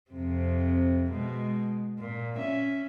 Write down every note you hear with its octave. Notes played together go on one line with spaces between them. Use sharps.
F2 C3
B2 G#3
A#2
C#4 E5